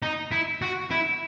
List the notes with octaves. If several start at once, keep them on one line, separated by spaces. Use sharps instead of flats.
D#4
E4
F#4
E4